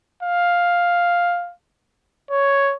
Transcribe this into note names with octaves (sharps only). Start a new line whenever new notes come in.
F5
C#5